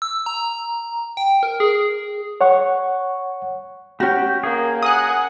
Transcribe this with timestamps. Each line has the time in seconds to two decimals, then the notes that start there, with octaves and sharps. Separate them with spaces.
0.02 E6
0.26 A#5
1.17 G5
1.43 A#4
1.60 G#4
2.41 C#5 F#5 C#6
4.00 C#4 F#4 G4 G5
4.43 A#3 G#4 A#4
4.83 F#5 G#5 D#6 F#6